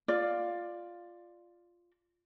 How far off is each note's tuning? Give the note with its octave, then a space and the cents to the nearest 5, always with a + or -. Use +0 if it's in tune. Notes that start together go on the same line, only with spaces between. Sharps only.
F4 +0 D5 +10